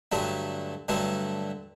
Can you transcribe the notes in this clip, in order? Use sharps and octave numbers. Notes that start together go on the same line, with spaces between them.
G2 D3 F#3 A3
G2 D3 F#3 A3